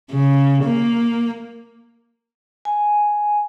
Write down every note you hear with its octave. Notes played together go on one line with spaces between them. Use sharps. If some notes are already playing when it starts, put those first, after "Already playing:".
C#3
A#3
G#5